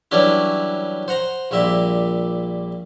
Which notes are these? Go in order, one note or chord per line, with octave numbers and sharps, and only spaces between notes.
E3 F#3 G3 C#4 D4 E4
C5 F#5 A#5
A#1 A#2 G3 E5